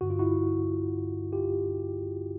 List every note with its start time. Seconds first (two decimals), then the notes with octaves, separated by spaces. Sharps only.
0.01 G2 D3 F#4
0.10 F4
0.19 E4 F#4
1.33 F4 G4